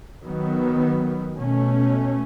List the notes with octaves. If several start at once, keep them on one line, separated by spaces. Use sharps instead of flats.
D#3 F#3 B3
B2 A3 C#4